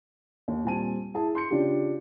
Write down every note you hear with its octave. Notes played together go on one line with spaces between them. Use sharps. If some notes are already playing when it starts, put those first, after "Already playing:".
D#2
A#2 G3 C4 G#5 A5 D#7
E4 G#4 A5
C6 G6 C#7
C#3 D4 F4 G4